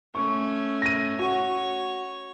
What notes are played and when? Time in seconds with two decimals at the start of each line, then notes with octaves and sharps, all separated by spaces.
0.15 A3 C#4 C#6
0.82 A#6 D#7
1.19 F#4 C#5 C#6